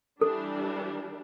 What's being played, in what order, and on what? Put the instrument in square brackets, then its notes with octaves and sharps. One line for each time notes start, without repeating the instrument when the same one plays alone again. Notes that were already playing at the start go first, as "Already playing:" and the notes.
[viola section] E3 G3 D4 [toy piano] A4